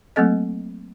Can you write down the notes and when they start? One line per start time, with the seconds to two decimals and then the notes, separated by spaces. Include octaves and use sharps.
0.16 F#3 A3 A#3 C4 A4 D#5